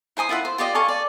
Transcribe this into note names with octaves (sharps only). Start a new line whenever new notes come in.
E4 C5 G#5 D#6
E4 F4 E5 F#5
C5
F4 G4 D5 D#5
A4 F5 G#5 C#6
D5